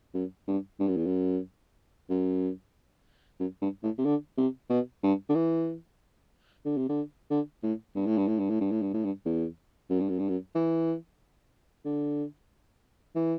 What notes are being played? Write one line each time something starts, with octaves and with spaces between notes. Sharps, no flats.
F#2
G2
G2
F#2
E2
F#2
F#2
F#2
G2
A2
C3
D3
C3
B2
G2
D3
E3
D3
C3
D3
D3
A2
G2
A2
G2
A2
G2
A2
G2
A2
G2
A2
G2
E2
F#2
G2
F#2
G2
F#2
E3
D3
E3